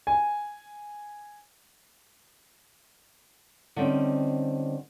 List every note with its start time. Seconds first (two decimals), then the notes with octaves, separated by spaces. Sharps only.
0.07 G#5
3.76 D3 D#3 G3 C4 C#4 D#4